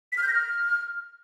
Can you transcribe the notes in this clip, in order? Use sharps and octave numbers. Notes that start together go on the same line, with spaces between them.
B6
F6
G6
A#6
F6